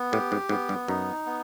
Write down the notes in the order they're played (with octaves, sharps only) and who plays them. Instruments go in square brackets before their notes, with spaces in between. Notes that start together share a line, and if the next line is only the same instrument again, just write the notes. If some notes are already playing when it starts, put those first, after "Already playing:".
Already playing: [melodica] B3
[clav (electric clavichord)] A2 [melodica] G4
[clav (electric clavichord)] G#2
[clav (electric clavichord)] G#2 [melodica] B3
[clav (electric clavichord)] G2
[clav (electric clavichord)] F#2 [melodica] D#4
[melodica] B3